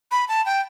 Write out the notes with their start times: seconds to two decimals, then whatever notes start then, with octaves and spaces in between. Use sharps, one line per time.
0.11 B5
0.28 A5
0.46 G5